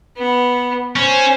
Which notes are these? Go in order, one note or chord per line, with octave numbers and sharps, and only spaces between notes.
B3
C#4 C5